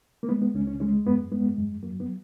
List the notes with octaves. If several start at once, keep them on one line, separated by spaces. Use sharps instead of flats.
A#3
G#3 B3
B3
C#2 C#4
C#4
G#3 C#4
F#2 B3
G#3 B3
F#2
F#3 A#3
B3